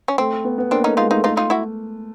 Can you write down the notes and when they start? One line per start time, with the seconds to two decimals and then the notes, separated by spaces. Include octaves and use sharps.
0.08 C#4
0.18 A3 C4
0.44 B3
0.58 B3
0.71 A#3 C4 D4
0.84 A3 C#4 D#4
0.97 G#3 D#4 F4
1.11 A3 D#4 F4
1.24 A3 D#4 F4
1.37 D#4 F4
1.50 E4 F#4